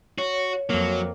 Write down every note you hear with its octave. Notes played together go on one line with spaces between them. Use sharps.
F#4 C#5
F2 F#3 A#3